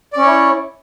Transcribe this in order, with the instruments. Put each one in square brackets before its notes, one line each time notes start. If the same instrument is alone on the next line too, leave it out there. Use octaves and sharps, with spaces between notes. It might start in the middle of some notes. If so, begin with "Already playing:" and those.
[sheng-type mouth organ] D5
C#4
C#5
E4